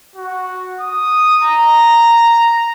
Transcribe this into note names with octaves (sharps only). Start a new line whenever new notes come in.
F#4
D#6
A#5